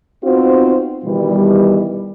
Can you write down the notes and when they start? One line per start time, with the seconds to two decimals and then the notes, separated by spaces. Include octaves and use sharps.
0.24 B3 C4 D#4 F4 F#4 C5
1.05 B2 D#3 E3 G3